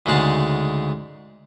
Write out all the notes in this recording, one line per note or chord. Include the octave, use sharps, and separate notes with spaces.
D2 G#2 C#3 G#3 A5